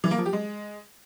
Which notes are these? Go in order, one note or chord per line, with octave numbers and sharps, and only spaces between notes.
E3
A#3
F3
G4
G#3